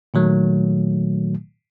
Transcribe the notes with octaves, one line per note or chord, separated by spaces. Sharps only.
A#2 D#3 F#3 A3